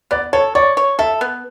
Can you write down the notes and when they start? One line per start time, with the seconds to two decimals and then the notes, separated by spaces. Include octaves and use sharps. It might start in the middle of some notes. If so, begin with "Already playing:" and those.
0.11 B3 D5
0.33 A4 C#5
0.55 C#5 D5
0.77 C#5
0.99 A4 E5
1.21 B3